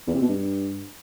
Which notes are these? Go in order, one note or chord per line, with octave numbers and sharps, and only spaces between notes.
E2
C3
B2
G2